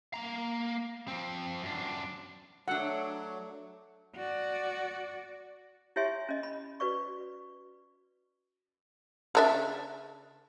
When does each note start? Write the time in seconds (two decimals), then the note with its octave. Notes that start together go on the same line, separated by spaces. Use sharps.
0.14 A#3 A#5
1.08 F3 C4
1.62 F#2 D4
2.68 F#3 A3 D4 F#5
4.16 F#4 D5
5.96 E4 G4 C#5 E5 G#5 C6
6.29 C#4 D#5
6.43 B5
6.80 F#4 B4 D5 C#6
9.35 C#3 D4 E5